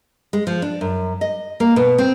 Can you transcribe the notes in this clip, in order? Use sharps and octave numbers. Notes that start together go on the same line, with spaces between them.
G#3
F3
D4
F#2
D#5
A#3
B2
C4